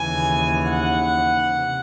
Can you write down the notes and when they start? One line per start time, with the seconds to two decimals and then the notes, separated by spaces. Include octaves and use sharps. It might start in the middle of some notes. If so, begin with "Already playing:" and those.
Already playing: D#2 C#3 E3 G#5
0.68 F#5
1.52 C3